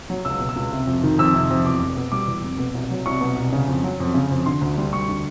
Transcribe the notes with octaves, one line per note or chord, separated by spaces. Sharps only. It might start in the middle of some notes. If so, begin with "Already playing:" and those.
F#3
C#2 E6
B2
E6
C#2
C3
F2
D#3
F2 E6
C3
F2
E2 D6
F1
B2
G3 D6
E2
F1
B2
C2
F#3
C2 C#6
B2
C2
C#3
F2
F#3
F2
C#3
F2
D3 C6
D2
G3
D2 C#6
D3